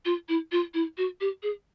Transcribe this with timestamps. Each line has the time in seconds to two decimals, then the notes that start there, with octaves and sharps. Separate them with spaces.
0.05 F4
0.28 E4
0.52 F4
0.74 E4
0.97 F#4
1.20 G4
1.43 G#4